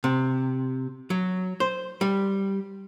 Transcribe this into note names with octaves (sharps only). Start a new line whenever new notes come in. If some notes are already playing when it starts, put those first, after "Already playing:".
C3
F#3
C5
G3